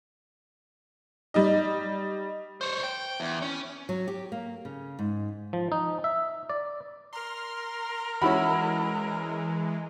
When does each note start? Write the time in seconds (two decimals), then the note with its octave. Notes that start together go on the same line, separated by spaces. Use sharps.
1.34 G3 D#4 D#5
2.61 C5 C#5
2.83 G5
3.20 E2
3.42 C#4
3.89 F#3
4.08 G4
4.32 A#3
4.65 C#3
4.99 G#2
5.53 F3
5.72 D#4
6.04 E5
6.50 D5
7.13 A#4 C6 F6
8.22 E3 G#3 C#4 E4 F#4 B5